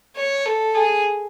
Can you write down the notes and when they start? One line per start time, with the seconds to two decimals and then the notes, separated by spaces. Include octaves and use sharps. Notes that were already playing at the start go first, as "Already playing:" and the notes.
0.16 C#5
0.45 A4
0.74 G#4